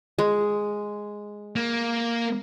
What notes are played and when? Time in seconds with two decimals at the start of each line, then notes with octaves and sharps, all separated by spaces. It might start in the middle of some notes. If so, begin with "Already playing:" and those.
0.19 G#3
1.56 A#3